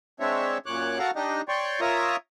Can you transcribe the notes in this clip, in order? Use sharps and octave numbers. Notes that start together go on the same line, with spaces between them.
G#3 C4 D4 C#5 E5
F#2 A#2 C#5 D6 F#6
F#4 A4 A#4 F5 F#5 A#5
D4 D#4 G4 D#5
C#5 D5 G5 C6 C#6
F4 A#4 C#5 E5 A#5 D#6